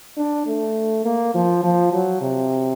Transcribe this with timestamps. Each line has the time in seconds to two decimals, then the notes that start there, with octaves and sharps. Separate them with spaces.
0.17 D4
0.47 A3
1.05 A#3
1.35 F3
1.64 F3
1.93 F#3
2.21 C3